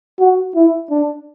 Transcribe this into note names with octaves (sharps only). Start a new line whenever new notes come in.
F#4
E4
D4